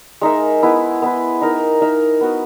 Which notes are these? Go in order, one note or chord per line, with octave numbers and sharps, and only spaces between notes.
G#3 D#4 A#4 E5
B3 E4 B4
B3 E4 B4
D#4 A#4 E5
D#4 A#4 E5
B3 F#4 B4